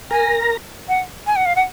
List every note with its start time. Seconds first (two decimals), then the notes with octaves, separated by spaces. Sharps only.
0.11 A#4 G#5 A#5
0.88 F#5
1.27 G#5
1.36 F#5
1.46 F5
1.56 F#5